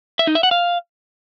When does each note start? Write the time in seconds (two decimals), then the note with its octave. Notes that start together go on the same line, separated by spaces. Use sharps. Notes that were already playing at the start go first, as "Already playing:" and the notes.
0.19 E5
0.27 D#4
0.35 E5
0.43 F#5
0.51 F5